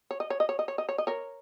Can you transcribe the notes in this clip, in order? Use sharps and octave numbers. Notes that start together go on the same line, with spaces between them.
C#5
D#5
C#5
D#5
C#5
D#5
C#5
D#5
C#5
D#5
A#4 C#5